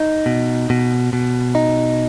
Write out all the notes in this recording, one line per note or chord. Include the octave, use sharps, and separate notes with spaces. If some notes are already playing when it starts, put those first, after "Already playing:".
Already playing: D#4
B2
B2
B2
D#4